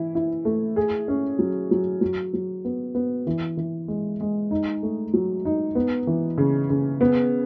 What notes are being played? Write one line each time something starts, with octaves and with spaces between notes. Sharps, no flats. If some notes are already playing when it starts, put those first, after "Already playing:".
Already playing: E3 E4
E4
A3
G#4
C#4
F#3
F#3
F#3
F#3
B3
B3
E3
E3
G#3
G#3
D#4
A3
F#3
D#4
B3
E3
C#3
C#3
B3